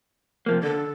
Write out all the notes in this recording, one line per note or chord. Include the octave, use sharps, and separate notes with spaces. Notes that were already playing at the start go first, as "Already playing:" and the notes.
C3 F3 A#3
D3 A4